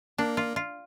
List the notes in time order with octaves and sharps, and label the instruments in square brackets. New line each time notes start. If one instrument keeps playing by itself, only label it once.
[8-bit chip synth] A#3 [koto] D4
[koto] F4
F4